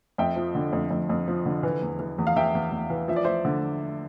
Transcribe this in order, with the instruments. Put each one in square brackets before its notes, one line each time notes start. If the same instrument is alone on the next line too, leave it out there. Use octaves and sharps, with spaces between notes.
[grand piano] F2 E5 G5
F3
D3
F2
F2
F2
F3
D3
E3
E2
E3
E2
F5
E2 E5 G5
E2
E2
E3
F3 E5
D5
F3 C5 E5
D3